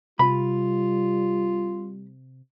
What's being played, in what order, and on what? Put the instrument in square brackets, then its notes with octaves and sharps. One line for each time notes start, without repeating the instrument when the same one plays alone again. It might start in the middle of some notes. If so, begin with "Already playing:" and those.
[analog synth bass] C3 [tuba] G3 [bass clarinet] F4 [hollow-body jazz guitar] B5